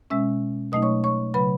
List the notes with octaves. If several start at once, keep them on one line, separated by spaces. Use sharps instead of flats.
B2 G#3 C#4 E5 E6
B2 F#3 A3 D#4 D#5 D#6
C#5 C#6
C#5 C#6
C#3 F#3 B4 B5